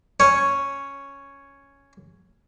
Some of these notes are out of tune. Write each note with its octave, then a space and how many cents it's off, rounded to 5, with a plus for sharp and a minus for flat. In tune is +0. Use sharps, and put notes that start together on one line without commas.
C#4 +0 C#5 +0